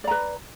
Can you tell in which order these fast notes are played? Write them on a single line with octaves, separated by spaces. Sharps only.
D5 A#5 B4